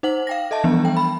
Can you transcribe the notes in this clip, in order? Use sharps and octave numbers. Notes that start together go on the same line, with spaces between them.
D#4 C5 F#5 F#7
F5 G5 A#6
A4 D#5 E5 A5
E3 F3 G3 B3 D4
G5
B5